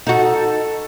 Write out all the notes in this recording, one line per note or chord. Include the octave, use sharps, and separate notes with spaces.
D#4 F#4 A4